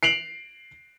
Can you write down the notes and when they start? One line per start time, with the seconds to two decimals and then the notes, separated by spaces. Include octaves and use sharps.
0.03 C7 D7 F7 F#7